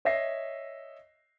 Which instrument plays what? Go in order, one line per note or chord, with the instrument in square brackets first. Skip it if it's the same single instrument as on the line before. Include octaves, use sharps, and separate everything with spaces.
[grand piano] C#5 D#5 E5 A#6 C7